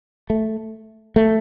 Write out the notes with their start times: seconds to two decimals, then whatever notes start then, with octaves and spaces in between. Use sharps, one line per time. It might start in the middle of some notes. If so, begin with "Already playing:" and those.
0.30 A3
1.16 A3